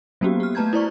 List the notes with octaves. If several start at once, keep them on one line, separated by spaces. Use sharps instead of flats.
F#3 A#3 B3 C#4 F#4 G4
G4 F6
A3 B4 A5 A#5 G6 G#6
E4 C5 D5 C#6